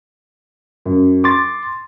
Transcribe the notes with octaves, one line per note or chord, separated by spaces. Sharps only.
F#2
C6 D6 A6